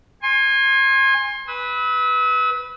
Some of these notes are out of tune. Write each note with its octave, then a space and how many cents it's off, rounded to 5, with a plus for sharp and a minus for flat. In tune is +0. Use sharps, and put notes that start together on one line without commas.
G#5 -20 C6 +25
B4 +0 E6 -45